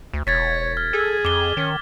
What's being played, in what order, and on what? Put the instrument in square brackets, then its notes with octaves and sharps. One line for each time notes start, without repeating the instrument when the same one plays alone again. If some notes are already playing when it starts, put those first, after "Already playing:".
[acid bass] D2
[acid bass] E1 [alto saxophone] C#5 [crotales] G#6 A6 B6
[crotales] F6
[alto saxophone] G#4 [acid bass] A4
[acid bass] F2 [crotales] D6 G7
[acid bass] D#3 [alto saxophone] C#4